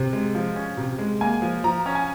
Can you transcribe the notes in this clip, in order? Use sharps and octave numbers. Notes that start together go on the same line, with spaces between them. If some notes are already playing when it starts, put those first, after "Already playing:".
Already playing: C3
G#3
F3
C#4
C3
G#3
A#3 G#5
F3
F3 A#5
C#4
G#5